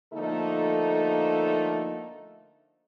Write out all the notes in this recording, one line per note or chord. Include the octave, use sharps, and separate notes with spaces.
D3 F3 A3 A#3 D#4 A4